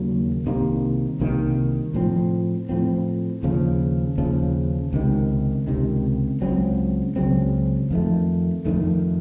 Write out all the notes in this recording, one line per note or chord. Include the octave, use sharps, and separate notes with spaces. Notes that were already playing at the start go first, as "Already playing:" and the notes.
Already playing: D#2 C#3 F#3 A#3
C2 C3 D#3 A#3
C2 C3 D#3 A#3
A2 F3 C4
A2 F3 C4
D#2 C#3 F3
D#2 C#3 F3
C#2 C3 D#3
C#2 C3 D#3
C#2 C#3 F#3 C4
C#2 C#3 F#3 C4
F2 D#3 A3
F2 D#3 A3